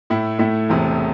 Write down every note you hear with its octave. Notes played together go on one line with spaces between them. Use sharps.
A2 A3 E4
A2 A3 E4
E1 E2 C3 A3